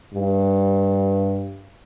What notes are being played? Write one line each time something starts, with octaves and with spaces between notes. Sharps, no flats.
G2